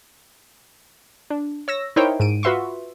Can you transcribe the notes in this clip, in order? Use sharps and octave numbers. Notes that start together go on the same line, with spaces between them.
D4
C#5 E6 A#6
D#4 E4 A#4 C5 C#5 G5
G#2 D7 D#7
F4 F#4 B4 E5 C6 C#6